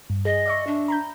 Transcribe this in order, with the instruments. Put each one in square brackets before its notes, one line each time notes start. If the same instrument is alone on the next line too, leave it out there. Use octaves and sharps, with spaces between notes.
[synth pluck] G2
[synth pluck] G#4 [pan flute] D#5
[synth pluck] D5 E5 C#6
[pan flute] D4
[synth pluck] A#5 B5 G6